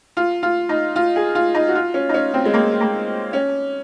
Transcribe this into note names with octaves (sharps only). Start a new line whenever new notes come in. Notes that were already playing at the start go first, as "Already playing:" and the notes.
F4
F4
D#4
F4
G#4
F4
D#4
F#4
F4
C#4
D#4
C#4
C4
G#3
A#3
A#3
C#4